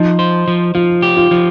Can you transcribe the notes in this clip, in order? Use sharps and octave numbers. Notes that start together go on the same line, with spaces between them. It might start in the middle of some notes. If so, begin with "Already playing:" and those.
Already playing: F3 D#4
C5
F3
F3 F4
G4
F4
F3